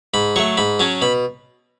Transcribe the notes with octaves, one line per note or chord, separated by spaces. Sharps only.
G#2 B5
F#3 A3 C#6
G#2 B5
F#3 C#4 A5
B2 B5